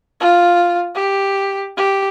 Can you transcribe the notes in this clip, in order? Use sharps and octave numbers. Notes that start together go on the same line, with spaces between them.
F4
G4
G4